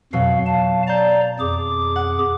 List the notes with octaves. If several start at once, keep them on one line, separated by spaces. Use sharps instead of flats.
F2 B2 F#3 F5
F5 A5
D5 A5 A#5 G6
F2 G#4 D6
F#5